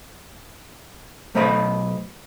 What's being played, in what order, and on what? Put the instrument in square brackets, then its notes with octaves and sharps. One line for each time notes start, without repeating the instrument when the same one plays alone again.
[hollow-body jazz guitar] B1 A3 C5 D#5 B5